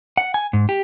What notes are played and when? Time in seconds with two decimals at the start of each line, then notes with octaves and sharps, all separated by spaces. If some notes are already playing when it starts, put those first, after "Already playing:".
0.17 F#5
0.34 G#5
0.53 G#2
0.69 G4